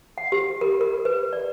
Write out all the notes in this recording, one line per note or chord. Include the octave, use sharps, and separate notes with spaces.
F#5
G4
A#4
A#4
B4
D5